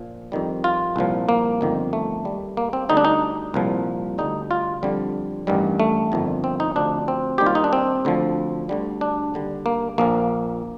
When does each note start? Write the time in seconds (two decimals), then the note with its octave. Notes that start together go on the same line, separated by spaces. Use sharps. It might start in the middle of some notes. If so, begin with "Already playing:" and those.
Already playing: A#1 A#2 F3
0.32 F2 D#3 G3
0.64 F4
0.96 C2 A#2 F3
1.29 A#3
1.61 G1 F2 D#3
1.93 A3
2.25 D#2 D#3 G3
2.57 A#3
2.73 C4
2.89 D2 D3 G3 D#4
2.97 D4
3.05 D#4
3.54 C2 A#2 F3
4.18 D2 D3 G3 D#4
4.51 F4
4.83 F2 D3 G3
5.47 A1 G2 D#3 G3
5.80 A3
6.12 G1 F2 D#3
6.44 C4
6.60 D#4
6.76 D2 C3 F3 D4
7.08 C4
7.38 D#2 D#3 G3 G4
7.46 F4
7.55 D#4
7.64 D4
7.73 C4
8.05 D2 D3 F3
8.69 D2 D3 G3
9.01 D4
9.34 D#2 D3 G3
9.66 A#3
9.98 A#1 A#2 F3 A#3